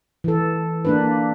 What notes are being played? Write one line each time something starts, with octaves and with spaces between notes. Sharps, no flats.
E3 A4
A#3 D4 B4